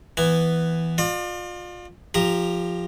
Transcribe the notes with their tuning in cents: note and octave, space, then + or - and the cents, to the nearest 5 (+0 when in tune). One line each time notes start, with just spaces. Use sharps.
E3 +0 B3 +0 G#5 -10
F4 +25 D5 +45
F3 +0 G4 +15 A#5 +0